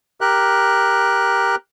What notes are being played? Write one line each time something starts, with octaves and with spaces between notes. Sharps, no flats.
G4 A#4 F#6